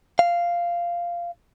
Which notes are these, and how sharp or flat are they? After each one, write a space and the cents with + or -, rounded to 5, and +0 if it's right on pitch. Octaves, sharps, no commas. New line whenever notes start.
F5 -10